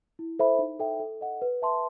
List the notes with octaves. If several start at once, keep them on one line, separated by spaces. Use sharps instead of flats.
E4
A4 C5 E5 B5
D#4
A4 E5 G5
A4
D#5 F#5
B4
E5 A5 C6